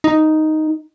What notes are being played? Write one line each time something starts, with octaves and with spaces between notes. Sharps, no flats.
D#4